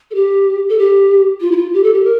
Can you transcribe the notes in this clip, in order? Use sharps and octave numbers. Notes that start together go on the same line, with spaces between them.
A4
G4
A4
G4
F4
E4
F4
G4
A4
G4
A#4